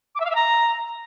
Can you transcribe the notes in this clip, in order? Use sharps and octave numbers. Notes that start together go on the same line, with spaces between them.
D6
E5
F5
E5
A#5